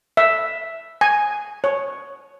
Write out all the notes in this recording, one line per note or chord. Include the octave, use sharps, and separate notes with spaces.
E5
G#5
C#5